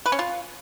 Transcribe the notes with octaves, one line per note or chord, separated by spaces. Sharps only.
B4
C#4
F4